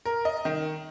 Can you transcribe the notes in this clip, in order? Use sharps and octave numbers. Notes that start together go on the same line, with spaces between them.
A#4
D#5
D#3